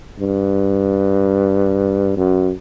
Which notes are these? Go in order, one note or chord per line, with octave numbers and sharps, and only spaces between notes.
G2
F#2